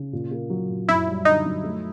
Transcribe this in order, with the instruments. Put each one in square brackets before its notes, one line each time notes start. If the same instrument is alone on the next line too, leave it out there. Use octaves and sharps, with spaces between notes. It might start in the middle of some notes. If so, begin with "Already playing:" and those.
Already playing: [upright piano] C#3
A#2
A#3
F#3
A#2
[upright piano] F#2 [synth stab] E4
[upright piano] G3
[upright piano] D3 [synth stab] D#4
[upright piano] F#2
A3